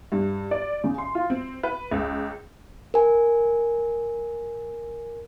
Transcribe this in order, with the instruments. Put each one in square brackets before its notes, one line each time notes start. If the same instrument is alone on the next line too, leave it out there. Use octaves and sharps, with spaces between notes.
[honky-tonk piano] G2
D5
C#3
C6
F4
C4
B4
C#2
[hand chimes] A#4 G#5